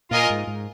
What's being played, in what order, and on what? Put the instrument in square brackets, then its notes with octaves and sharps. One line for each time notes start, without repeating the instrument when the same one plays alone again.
[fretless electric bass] A#2 [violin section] F4 A#4 D#5 G#5
[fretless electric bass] G#2
G#2